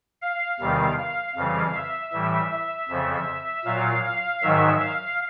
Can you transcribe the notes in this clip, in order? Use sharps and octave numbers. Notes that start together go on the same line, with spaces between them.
F5
E2 C3 D#3 G3
F5
F2 C#3 E3 G3 F5
E5
A2 E3 G3
E5
F2 C#3 F3
A#2 F#3 F5
F5
G#2 D#3 F#3 E5
F5